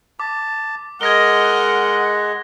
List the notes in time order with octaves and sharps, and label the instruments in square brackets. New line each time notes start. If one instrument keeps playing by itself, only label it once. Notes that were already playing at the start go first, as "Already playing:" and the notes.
[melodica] A5 [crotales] D6
[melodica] G#3 [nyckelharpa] A#4 D#5 [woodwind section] F#5 [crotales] G#6 A#6 G7